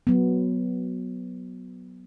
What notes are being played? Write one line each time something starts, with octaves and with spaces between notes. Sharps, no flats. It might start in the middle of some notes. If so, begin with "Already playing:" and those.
F#3 B3